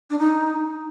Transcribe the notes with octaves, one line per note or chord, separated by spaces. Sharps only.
D4
D#4